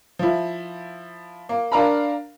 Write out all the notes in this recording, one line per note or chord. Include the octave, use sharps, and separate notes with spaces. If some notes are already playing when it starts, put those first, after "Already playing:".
F3 E4
A#3
D4 A#4 F5 A#5 B5